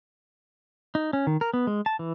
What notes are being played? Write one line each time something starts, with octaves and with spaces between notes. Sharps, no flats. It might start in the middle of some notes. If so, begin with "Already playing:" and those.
D#4
C#4
D#3
A#4
B3
G#3
A5
E3